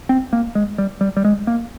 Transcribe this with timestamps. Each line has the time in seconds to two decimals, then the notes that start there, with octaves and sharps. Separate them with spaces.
0.09 C4
0.33 A#3
0.55 G#3
0.78 G3
1.01 G3
1.17 G3
1.25 G#3
1.47 A#3